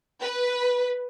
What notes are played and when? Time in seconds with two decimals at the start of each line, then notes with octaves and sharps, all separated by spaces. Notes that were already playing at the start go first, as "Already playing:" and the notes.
0.22 B4